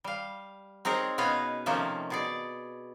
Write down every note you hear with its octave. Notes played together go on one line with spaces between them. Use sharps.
G3 F5
C4 D#4 G#4 A#4 C#5
B2 C#4 B4 C#5 D#5 F5
C3 D#3 F3 A3 A#3 C#4
B2 G#4 D5